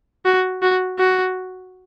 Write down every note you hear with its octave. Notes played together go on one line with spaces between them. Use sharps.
F#4
F#4
F#4